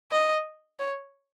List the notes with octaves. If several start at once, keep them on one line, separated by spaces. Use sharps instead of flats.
D#5
C#5